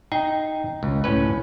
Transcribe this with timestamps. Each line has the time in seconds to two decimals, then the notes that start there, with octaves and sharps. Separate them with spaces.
0.12 D#4 G5
0.83 C#2
1.04 A2 C#4 B4